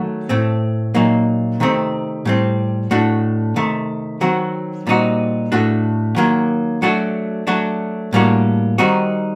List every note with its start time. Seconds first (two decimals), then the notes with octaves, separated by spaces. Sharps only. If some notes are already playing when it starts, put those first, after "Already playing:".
Already playing: D#3 F#3 A3 F#4
0.29 A2 A3 C4
0.94 A#2 F#3 A#3 D#4
1.60 C3 D#3 A3 C4
2.25 A2 G3 C4
2.91 A2 A3 D4 F#4
3.56 C3 D#3 A3
4.21 D#3 F#3 C4 F#4
4.87 A#2 G3 C4 D#4 F#4
5.52 A2 A3 D4 F#4
6.16 D#3 F#3 A#3
6.82 F#3 A3 D4 F#4
7.47 F#3 A3 D4 F#4
8.13 A2 G3 A#3 D4 F#4
8.78 D#3 G3 C4 D#4 F#4